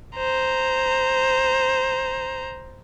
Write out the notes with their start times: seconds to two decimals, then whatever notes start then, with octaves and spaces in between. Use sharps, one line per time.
0.16 C5 A#5